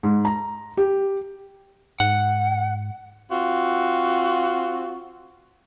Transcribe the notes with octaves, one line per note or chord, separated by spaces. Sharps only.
G#2
A#5
G4
G#2 F#5
C4 F4 F#4